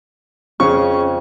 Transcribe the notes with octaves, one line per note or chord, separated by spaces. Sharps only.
F2 C#3 C#6